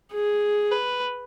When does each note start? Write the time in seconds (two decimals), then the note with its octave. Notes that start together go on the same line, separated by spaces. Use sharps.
0.13 G#4
0.72 B4